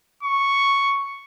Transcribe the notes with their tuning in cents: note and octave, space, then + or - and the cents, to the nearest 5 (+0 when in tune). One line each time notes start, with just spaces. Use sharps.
C#6 +0